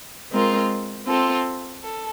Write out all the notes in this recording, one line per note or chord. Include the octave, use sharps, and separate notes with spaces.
G#3 C4 F4 A#4
C4 F4 A4
A4